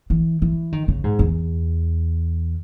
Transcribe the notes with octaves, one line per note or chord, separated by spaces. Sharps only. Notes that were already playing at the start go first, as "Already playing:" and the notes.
E3
E3
D#3
C#3
G#2
E2